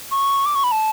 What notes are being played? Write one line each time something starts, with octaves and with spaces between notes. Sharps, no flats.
C#6
D6
C#6
B5
A5